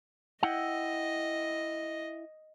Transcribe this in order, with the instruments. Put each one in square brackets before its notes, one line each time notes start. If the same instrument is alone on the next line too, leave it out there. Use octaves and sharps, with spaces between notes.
[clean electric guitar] E4 F#5 G5 [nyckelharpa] D#5